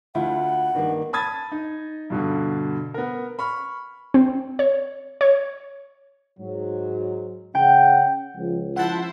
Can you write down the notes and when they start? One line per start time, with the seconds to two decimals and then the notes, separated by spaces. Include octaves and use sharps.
0.15 D2 E4 F4 F#5
0.74 G2 D#3 A#3
1.13 A5 B5 D#6 G#6 A6
1.52 D#4
2.10 G2 B2 D3
2.94 B3 A#4
3.39 B5 C#6 F6
4.14 C4
4.59 C#5
5.21 C#5
6.39 G#2 F#3
7.55 C#3 F#5 G5
8.37 C#2 F3
8.76 F3 E4 C5 F#5 A5